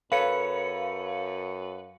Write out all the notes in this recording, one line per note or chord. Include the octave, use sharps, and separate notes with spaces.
F#2 A4 B4 C#5 F5 C#7